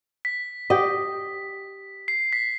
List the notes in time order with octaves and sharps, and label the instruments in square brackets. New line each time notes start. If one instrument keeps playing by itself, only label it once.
[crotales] B6
[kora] G4 D#5
[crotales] C7
B6